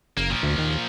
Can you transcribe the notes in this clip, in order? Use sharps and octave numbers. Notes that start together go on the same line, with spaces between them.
F#1 A#3
A#2 F3
D2
D#2